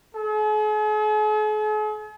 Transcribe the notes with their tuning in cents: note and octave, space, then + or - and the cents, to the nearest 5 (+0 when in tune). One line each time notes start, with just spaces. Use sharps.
G#4 +45